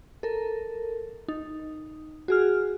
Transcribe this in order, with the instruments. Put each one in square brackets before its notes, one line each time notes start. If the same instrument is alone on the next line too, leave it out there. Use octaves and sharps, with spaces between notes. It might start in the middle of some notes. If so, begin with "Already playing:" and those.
[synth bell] A4 A#4
D#4
F#4 G#4 F6